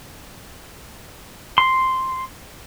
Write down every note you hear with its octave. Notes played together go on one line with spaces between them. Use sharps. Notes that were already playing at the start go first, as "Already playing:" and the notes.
C6